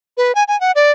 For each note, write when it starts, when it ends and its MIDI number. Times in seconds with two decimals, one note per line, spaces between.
0.17 0.34 71
0.35 0.44 80
0.48 0.59 80
0.61 0.72 78
0.75 0.92 74